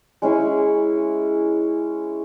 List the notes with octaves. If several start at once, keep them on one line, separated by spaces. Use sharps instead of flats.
G#3 C#4 E4 G#4